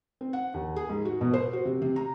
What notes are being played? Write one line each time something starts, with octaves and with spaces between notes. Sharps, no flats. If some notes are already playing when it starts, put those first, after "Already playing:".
C4
F#5
D#2
G#4
G#2
F#4
B2
C5
F#4
C3
C3
A#5